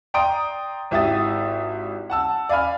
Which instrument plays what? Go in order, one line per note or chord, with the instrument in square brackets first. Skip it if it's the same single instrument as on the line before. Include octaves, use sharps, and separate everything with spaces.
[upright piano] D5 G5 A#5 C6 D#6 D7
G#1 E4 G4 E5 D#6 A6
F#5 A5 E6
D5 F5 G#5 B5 F6